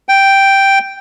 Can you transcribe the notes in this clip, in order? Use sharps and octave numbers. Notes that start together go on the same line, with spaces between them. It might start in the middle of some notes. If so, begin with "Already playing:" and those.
G5